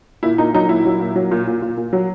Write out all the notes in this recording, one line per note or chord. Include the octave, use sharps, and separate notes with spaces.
A#2 E4
A#2 D#4
F#3 D#4
A#2 E4
F#3
A#2
F#3
A#2
A#2
A#2
A#2
F#3